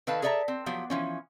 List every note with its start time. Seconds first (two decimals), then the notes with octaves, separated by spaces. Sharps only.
0.07 D#3 A4 B4 F5 A5
0.22 G#4 A4 D5 E5 A5 A#5
0.48 C4
0.66 F3 F#3 B3 G4
0.90 E3 F3 C#4